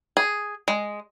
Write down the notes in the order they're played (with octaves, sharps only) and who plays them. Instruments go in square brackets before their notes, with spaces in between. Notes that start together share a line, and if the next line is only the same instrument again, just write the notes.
[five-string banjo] G#4
G#3